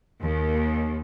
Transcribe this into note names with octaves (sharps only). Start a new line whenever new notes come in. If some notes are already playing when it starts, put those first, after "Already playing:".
D#2